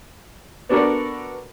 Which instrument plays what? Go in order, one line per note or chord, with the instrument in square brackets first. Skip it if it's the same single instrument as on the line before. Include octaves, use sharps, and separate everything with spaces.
[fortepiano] B3 D4 F#4 A4 A#4 D5